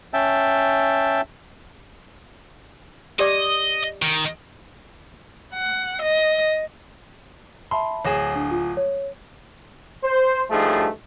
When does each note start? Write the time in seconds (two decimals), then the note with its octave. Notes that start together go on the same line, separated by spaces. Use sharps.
0.14 C#4 E5 G5 A5
3.19 G4 D5 D#5 D6
4.02 D#3
5.54 F#5
6.02 D#5
7.71 E5 A5 B5 C6
8.05 D1 G#4 C#5 A#6 E7
8.36 D4
8.51 F4
8.77 C#5
10.04 C5
10.50 G2 F3 A3 D#4 G#4